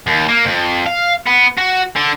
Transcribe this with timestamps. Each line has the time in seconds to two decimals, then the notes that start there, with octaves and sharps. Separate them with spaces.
0.07 D#2
0.29 A#3
0.45 F2
0.86 F5
1.27 B3
1.58 F#4
1.96 D3